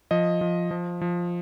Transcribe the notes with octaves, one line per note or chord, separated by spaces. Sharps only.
F3 D#5
F3
F3
F3